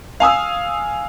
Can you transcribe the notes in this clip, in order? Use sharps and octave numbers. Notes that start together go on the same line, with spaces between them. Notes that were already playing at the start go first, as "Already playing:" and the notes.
F5 G#5 D#6 E6